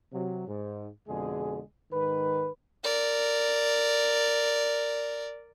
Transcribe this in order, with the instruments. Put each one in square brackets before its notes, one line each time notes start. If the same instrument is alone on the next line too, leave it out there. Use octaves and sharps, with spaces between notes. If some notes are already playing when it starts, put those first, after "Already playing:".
[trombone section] C3 F#3
G#2
F2 B2 D3 G#3 G#4
G#2 D#3 B4
[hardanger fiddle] A#4 D5